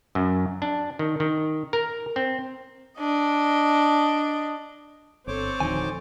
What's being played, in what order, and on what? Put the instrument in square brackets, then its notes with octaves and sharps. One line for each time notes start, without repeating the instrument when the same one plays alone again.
[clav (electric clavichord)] F#2
D4
D#3
D#3
A#4
C4
[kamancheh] D4 D#5
[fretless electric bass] G1 [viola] C4 A4 [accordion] C5 C#5 D6
[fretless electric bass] D1 D2 D#3 [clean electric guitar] F3 D#4 G#5